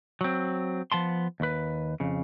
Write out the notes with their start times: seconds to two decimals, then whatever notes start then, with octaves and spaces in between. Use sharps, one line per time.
0.21 F#3 C4
0.92 F3 B3 A5 C6
1.40 D#2 B4
2.00 F2 C#3